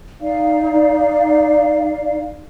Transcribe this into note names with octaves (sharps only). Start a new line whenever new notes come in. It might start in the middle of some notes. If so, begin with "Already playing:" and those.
D#4 D5 F5